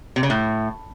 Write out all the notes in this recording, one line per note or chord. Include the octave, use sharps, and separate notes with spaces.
C3
C#3
A2